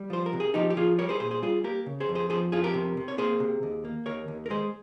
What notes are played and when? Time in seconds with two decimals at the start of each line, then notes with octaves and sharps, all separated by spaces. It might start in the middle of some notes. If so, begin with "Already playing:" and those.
Already playing: G3
0.10 F3 C5
0.26 A#4
0.33 C3
0.40 G#4
0.54 F3 D#4 G4
0.70 G4
0.77 F3 F4 G#4
0.98 G3 A#4 C#5
1.09 G#4 C5
1.20 A#2 G#4 C5
1.31 G#4 C5
1.42 G3 F4 G#4
1.64 A#3 G4 A#4
1.86 C#3
2.00 G#4 C5
2.09 F2
2.15 G#4 C5
2.30 F3 G#4 C5
2.52 F2 F4 G#4
2.64 G4 A#4
2.74 C3
2.97 C3
3.08 C#5
3.18 A#3 G#4 C5
3.40 C3
3.63 D#2
3.85 A#3
4.06 D#2 A#4 C#5
4.28 D#2
4.46 A#4
4.50 G#3 G#4 C5